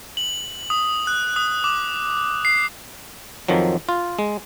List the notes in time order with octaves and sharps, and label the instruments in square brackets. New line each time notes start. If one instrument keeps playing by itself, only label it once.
[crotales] F#7
D#6
F#6
D#6
D6
C7
[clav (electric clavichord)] F2 D#3 F3 F#3
F4
G#3